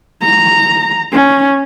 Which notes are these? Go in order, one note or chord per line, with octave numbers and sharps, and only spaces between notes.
A#5
C#4